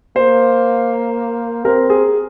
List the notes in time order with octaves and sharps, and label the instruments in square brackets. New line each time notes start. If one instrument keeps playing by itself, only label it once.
[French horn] A#3 [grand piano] C5
[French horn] C4 [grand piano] A#4
[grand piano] G#4